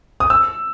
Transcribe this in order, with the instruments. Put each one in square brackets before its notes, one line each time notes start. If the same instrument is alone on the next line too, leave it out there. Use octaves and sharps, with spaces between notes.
[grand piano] D#6
E6